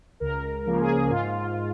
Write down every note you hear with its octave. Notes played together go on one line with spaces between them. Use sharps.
C#2 A#4
C#3 F3 A#3 C#4
G#4
G#2 F4